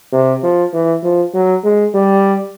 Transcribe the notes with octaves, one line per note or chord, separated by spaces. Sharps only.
C3
F3
E3
F3
F#3
G#3
G3